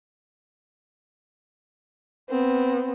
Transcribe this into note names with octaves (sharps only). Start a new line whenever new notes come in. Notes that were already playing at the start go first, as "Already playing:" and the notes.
B3 C4